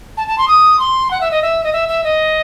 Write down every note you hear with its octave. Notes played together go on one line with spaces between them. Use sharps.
A5
A5
C6
D#6
C6
F#5
E5
D#5
E5
D#5
E5
E5
D#5